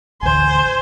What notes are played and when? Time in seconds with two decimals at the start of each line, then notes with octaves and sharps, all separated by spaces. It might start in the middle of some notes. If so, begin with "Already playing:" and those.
0.23 A1 D2 C5 G#5